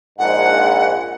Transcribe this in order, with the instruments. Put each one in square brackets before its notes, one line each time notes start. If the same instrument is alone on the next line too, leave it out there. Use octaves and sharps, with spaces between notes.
[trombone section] A#1 G#2 [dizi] F#5